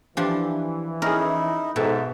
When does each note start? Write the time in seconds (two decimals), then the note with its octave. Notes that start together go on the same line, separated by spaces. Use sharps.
0.17 E3 F3 D4 G4
1.02 C#4 D#4 E4 G#4 A#4
1.76 G#2 B2 A4 E5